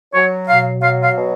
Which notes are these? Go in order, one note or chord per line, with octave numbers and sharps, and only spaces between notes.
F#3 C#5
B2 F5
F#3 F5
F5
B2